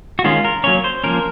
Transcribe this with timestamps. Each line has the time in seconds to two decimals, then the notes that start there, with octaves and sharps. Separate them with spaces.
0.19 F#4
0.24 D#3 G#3 C#4 F4
0.45 A#4
0.64 F#3 A#3 C#4 C#5
0.84 C5
1.04 F3 A#3 C#4 A#4